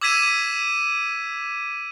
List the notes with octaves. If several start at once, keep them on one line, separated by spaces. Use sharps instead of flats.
D6 E6 G#6 B6 D#7 E7